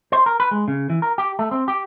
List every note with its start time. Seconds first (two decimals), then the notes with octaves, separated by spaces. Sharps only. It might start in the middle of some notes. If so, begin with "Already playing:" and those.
0.12 C5
0.26 A#4
0.40 B4
0.51 G#3
0.68 C#3
0.90 E3
1.02 A#4
1.18 G4
1.39 A3
1.51 C4
1.68 G4